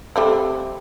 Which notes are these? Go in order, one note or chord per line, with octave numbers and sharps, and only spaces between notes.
G3 A3 C4